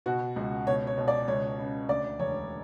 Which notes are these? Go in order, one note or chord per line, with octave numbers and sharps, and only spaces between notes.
B2 F#4
C#2
B2 C#5
C#5
B2
D5
C#2 C#5
C#3
D2 D5
E1 C#5